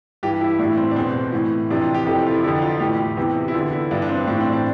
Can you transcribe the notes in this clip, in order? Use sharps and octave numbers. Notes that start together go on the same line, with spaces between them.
G2 E3 G4
E4
A2 E3 D4
C4
D4
E2 B2 C4
A2 E3
F2 C3 E3 D4
F4
G4
F2 C3 E3 A4
G4
F4
E4
F2 D3 E4
F4
A2 E3 G4
E2 C3 E3
E4
E2 D3 F4
E4
G2 E3 D4
D4
C4
A2 E3 D4
C4
D4